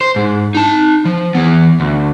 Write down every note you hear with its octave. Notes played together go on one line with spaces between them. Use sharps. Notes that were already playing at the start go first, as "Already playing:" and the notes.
C5
G#2
D#4 A5
F3
E3 B3
D2